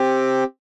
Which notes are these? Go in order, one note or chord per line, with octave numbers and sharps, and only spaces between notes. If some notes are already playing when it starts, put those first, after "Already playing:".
Already playing: C4 G4